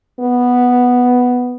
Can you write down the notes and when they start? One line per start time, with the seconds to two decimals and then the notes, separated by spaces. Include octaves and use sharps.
0.20 B3